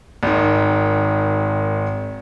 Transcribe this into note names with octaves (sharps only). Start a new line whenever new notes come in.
G#1 D#3